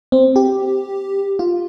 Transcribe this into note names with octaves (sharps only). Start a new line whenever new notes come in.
C4
G4
F4